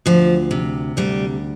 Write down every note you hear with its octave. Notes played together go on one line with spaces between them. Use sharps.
D2 F3
C3
D2 G3